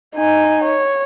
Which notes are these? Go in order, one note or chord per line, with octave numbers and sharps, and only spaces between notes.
D#4 G#5
C#5